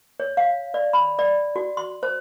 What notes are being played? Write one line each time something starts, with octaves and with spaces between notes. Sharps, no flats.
C#5
F5
D5
B5
D5
F#4
C6
C5